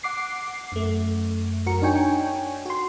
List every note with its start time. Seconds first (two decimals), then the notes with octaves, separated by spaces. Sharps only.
0.03 F#5 D6 C7
0.72 F#2 A3
1.66 F#2 F#4 A#4 C#7
1.82 D4 D#4 C#5 G5 G#5
2.65 F#4 C6